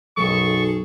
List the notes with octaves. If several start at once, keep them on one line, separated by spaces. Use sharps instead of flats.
B1 F#2 G#4 A4 C#6